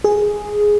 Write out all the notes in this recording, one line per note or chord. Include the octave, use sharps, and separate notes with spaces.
G#4